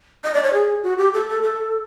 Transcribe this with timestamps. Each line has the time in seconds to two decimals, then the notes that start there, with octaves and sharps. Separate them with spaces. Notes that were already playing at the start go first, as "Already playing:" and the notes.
0.24 D#5
0.34 D5
0.43 C#5
0.53 G#4
0.83 F#4
0.98 G4
1.13 A4
1.29 A4
1.43 A4